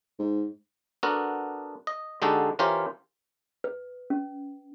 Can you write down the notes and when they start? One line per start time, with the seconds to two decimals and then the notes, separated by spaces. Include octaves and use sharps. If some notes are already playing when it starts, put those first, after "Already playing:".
0.19 G#2
1.03 B3 D4 F#4 A4 A#4
1.87 D#5
2.22 D3 G#3 D#4 F#4 G4 A4
2.59 E3 C#4 F4 G4 A#4 C5
3.64 B4
4.10 C#4